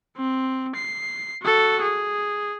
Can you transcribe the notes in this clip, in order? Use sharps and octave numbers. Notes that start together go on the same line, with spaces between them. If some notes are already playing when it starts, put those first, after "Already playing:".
C4
C7
F#4 A4
G#4